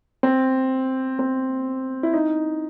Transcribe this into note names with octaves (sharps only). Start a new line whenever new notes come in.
C4
C4
E4
D#4